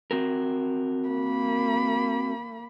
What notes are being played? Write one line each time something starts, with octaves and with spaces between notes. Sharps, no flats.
C4 F#4 A#4
A#3 B5